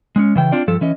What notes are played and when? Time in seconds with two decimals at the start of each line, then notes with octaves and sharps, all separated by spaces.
0.16 G#3 C4 C#4
0.35 C#3 E3 G5
0.52 C4 D4 F4 D5
0.67 G2 F3 A4
0.81 E3 C#4 D#5